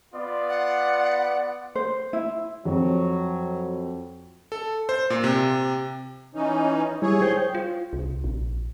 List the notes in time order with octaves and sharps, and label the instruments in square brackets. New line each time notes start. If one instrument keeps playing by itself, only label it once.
[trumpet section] B3 F4 D5
[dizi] F#5
[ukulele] C5
E4
[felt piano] F2 [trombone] F#3
[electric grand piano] A4
C5
A#2
C3
[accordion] E3 C#4 D#4
[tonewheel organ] G3 E4 [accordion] G#4 C#5
[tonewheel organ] C5 G5
[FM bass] F4
C2
A#1